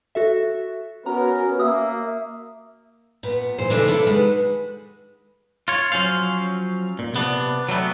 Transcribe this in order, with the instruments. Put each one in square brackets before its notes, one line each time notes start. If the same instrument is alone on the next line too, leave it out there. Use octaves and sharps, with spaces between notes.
[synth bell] F#4 A4 E5
[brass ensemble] B3 C#4 A#4 [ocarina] F#4 [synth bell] A#5
[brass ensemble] A#3 [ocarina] E5 [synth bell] D#6 E6
[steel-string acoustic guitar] A#2 B3
A#2 E3 C5
C#3 E3 F3 A3 D4 D#4
D4 E4 F4 A4
D#3 G#3 F#4 B4
[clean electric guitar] F4 C#5
F3 F#3 C#4 C5 F5
A#2
C3 B3 D4
F#3 G3 A3 B3